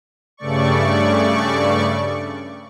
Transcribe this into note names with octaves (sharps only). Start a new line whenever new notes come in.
G2 C#3 A3 D5 C#6